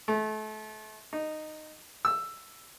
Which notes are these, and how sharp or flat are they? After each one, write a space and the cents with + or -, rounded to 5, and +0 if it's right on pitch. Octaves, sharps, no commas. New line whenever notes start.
A3 -30
D#4 -10
E6 +10